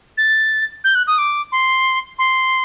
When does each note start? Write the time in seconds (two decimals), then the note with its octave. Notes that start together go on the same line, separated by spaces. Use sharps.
0.18 A6
0.84 G6
0.95 F#6
1.07 D#6
1.18 D6
1.52 C6
2.19 C6